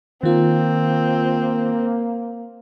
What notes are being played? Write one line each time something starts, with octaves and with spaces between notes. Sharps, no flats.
D#3 A#3 C4 F4